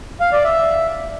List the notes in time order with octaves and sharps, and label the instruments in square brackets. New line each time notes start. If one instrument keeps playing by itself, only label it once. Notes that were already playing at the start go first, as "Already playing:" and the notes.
[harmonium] F5
D5
E5